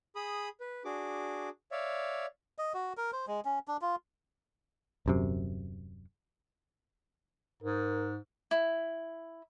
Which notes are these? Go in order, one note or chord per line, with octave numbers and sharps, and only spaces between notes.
G#4 B5 D#6
B4
D4 F#4 G#4 D6
C#5 D5 E5 F5
D#5
F#4
A#4
C5
G#3
C#4
D4
F4
D#1 F#2 C3
G#2 A#4
E4